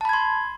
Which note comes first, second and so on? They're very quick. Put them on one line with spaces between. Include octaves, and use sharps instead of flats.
A5 B5 G#6 C6